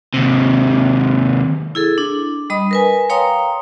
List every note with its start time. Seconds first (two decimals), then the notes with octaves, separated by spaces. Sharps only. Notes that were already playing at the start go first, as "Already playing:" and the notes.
0.14 D#2 C3
1.75 E4 G#4 A4
1.98 D4
2.50 G3 D#5 B5 D#6
2.71 A#4 B4 G#5
3.10 C#5 F5 G5 A#5 C6 D#6